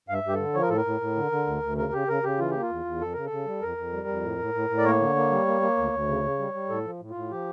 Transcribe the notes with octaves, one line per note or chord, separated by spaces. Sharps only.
G2 E5 F5
G2 G4
D3 A4
F3 C#5
A#4
A2 A4
A#4
A2
A2
D3
D3
D2
D2
C#3 A#4
C#3 G4
C#3 A#4
C#3 G4
E3 F4
A#3 G4
F4
E2
E2
F2 A4
C#3 A#4
A4
C#3
G3
F2 A#4
F2
G3
F2
A2
A2
A2
A2
D5
A#3 C#5
D3
A#3
G3
A#3
A#3
D2
D2
C#3
C#3
G3
G3
A2 A4
F3
A2
F4
A2
F3 G4